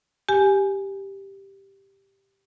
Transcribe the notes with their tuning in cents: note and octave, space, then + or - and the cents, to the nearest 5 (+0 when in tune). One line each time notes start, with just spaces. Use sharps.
G4 +0 G#5 +0